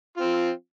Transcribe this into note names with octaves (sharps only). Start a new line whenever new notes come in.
F3 C4 F4